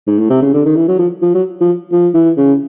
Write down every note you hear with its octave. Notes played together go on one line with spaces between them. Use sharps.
G#2
A2
C3
C#3
D3
D#3
E3
F#3
F3
F3
F#3
F3
F3
E3
C#3